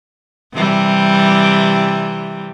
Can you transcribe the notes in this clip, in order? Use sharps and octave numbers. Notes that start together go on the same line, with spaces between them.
C3 E3 G3